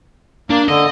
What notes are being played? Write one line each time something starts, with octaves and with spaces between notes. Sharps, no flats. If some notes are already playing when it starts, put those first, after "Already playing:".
A#3 D4
D3 D#5